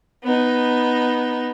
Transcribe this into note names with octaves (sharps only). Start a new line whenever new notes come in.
B3 D#4